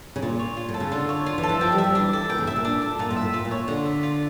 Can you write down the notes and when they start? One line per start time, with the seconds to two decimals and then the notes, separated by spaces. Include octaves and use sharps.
0.16 C#3
0.22 A#2 F4
0.39 C#5
0.57 F4
0.69 A2
0.74 A4
0.80 C#3
0.91 D3 F4
1.09 C#5
1.26 D3 F4
1.38 E3
1.43 A4
1.49 E3
1.61 F3 G5
1.72 G3
1.78 E5
1.84 G3
1.90 F3
1.95 E3 D4
2.13 A4
2.30 A#2 G5
2.38 C#3
2.47 A2 E5
2.56 A#2
2.65 D4
2.82 A4
2.99 A#2 F4
3.11 A2
3.16 E5
3.22 A2
3.34 A#2 F4
3.45 A#2
3.51 C#5
3.68 D3 F4
3.86 E5
4.03 F4